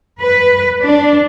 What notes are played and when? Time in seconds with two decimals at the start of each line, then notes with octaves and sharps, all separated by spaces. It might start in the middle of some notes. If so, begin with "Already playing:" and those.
0.21 B4
0.83 D4